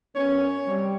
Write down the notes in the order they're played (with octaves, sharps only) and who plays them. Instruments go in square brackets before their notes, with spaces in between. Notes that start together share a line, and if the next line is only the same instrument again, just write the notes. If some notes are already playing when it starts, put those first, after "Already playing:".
[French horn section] F#2 B3 C#4 [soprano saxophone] C#5
[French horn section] C3 G3